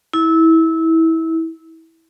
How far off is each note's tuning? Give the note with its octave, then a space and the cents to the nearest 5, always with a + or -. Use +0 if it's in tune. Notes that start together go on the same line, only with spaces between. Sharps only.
E4 -25